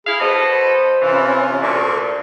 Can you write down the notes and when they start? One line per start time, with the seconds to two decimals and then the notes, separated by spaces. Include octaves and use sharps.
0.07 E4 G#4 F5 B5
0.21 B2 A4 C5 D#5
1.02 C3 E3 C#4 F4
1.63 D2 A#2 A4 C#6